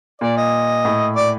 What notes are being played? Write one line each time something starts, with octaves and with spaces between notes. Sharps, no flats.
A#2 D5
D#5
A2
D5